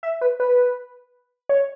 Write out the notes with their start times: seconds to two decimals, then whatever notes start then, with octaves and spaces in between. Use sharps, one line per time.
0.03 E5
0.21 B4
0.40 B4
1.49 C#5